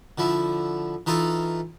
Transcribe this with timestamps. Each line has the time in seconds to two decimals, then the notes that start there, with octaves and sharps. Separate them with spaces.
0.18 D3 F3 E4
1.07 E3 D#4 F4 A4